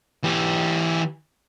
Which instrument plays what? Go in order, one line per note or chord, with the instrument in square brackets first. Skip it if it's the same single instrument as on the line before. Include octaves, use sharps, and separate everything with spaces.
[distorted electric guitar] E3 G4